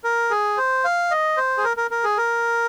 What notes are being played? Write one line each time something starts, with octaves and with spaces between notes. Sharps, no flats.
A#4
G#4
C5
F5
D#5
C5
G#4
A#4
A#4
A#4
G#4
A#4